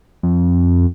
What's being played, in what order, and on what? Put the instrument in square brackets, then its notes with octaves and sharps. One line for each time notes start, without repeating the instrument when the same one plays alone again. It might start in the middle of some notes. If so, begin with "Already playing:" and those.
[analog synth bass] F2